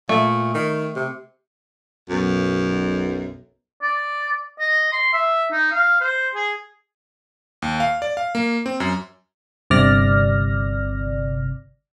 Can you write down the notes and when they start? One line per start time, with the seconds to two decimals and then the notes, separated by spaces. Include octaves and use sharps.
0.09 A#2 A3
0.54 D#3
0.96 C3
2.09 B1 F#2
3.82 D5
4.59 D#5
4.93 C6
5.13 E5
5.52 D#4
5.72 F5
6.01 C5
6.35 G#4
7.62 D#2
7.80 F5
8.02 D5
8.17 F5
8.35 A#3
8.66 C4
8.80 F#2
9.70 G1 C3 D5 F6 A#6